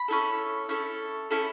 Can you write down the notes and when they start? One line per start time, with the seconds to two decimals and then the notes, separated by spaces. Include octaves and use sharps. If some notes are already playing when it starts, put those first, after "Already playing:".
Already playing: B5
0.08 C#4 E4 A4
0.69 C#4 E4 A4
1.30 C#4 E4 A4